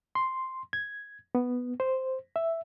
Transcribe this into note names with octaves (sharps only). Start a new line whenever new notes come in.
C6
G#6
B3
C5
E5